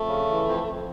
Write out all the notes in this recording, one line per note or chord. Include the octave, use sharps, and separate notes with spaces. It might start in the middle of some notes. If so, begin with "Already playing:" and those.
Already playing: F2 A3
C#3
E3
F2
F2